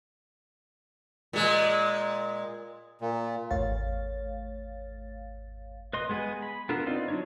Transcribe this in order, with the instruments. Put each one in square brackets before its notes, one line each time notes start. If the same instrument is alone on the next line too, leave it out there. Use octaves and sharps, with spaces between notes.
[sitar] A#2 G#3
[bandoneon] A#2
[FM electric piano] G#1 E2 A3 C#5 F5 A6
[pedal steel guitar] B4 D#5 C6
G#3 B3 G#4 B4 G#5
B5
B3 D4 F4 A4 A#4
C4 D#4 F4 D5
F#3 D4 C#5